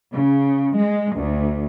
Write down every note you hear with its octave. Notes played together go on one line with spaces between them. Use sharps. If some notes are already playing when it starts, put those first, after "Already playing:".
C#3
G#3
D2